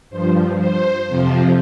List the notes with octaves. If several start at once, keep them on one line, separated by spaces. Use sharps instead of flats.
G2 F3 C5
C5
F2 C3 F3